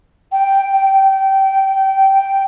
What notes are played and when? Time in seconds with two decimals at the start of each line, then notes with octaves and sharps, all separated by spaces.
0.32 G5
0.74 G5